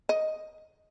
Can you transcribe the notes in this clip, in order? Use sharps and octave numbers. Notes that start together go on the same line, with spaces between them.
D#5